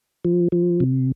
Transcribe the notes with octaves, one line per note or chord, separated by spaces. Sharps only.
F3
F3
C3